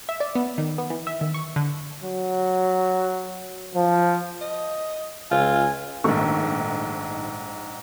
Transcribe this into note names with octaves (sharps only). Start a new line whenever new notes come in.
E5
D5
B3
D#3
B3
E3
E5
D#3
C#6
D3
F#3
F3
D#5
C#2 F4 G#5
A#1 G#2 D#3 A3 C#6